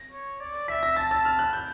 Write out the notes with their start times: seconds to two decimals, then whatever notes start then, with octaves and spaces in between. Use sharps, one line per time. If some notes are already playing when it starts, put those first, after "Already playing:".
Already playing: A#6
0.11 C#5
0.40 D5
0.68 E5 B6
0.83 A#6
0.97 A5 A6
1.11 E6
1.25 F6
1.39 F#6
1.53 G6